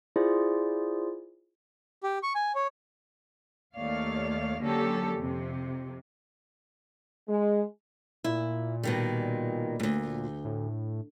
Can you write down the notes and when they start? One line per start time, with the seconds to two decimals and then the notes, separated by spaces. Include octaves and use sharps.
0.16 E4 F4 G#4 C5 D5
2.03 G4
2.23 C#6
2.35 G#5
2.55 C#5
3.76 D#2 A3 C#5 D5 F5
4.61 D3 F#3 A#3 C#4 G4 A4
5.17 F2 C3
7.27 G#3
8.24 A#2 E4
8.83 B2 D#3 G3
9.80 D2 G#2
10.45 A2